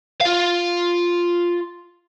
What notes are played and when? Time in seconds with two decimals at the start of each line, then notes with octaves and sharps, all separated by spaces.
0.21 F4 F5